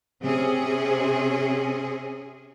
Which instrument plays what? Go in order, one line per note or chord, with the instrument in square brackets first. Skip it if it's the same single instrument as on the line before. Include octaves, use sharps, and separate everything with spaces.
[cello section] C3 C4 C#4 G#4